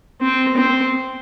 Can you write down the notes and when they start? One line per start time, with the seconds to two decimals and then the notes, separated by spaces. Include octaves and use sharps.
0.21 C4
0.57 C4